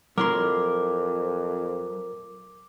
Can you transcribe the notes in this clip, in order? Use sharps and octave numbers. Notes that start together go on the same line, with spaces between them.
F2 F#3 E4 A#4 C6 D6